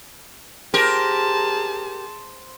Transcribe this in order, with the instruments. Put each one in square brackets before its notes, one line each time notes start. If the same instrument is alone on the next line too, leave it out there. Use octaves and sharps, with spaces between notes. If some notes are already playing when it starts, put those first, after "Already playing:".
[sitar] G4 A#4 [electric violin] G#4 A5 [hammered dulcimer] C5